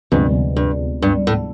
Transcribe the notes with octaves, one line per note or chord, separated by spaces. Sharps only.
D2 G2 C3 F3 G#3 B3
G2
G2
A2